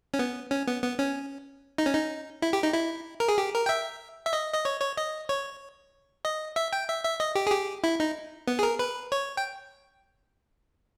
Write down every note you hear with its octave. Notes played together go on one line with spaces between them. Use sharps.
C#4
B3
C#4
B3
B3
C#4
D#4
C#4
D#4
E4
G4
D#4
E4
A#4
G#4
G4
A#4
G5
E5
E5
D#5
D#5
C#5
C#5
D#5
C#5
D#5
E5
G5
E5
E5
D#5
G4
G#4
G4
E4
D#4
B3
G#4
A#4
B4
C#5
G5